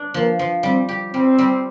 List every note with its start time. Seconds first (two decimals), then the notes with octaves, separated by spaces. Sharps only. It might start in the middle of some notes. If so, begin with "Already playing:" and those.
Already playing: D4
0.14 F3 A#3
0.39 F3
0.63 G3 C4
0.89 G4
1.13 G3 C4
1.38 G3